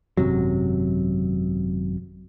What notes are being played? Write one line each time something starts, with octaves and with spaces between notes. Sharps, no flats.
G#1 F#2 C3 F#3